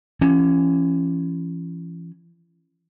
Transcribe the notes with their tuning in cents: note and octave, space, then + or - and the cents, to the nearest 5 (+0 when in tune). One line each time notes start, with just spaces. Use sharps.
E3 +40 C#4 -10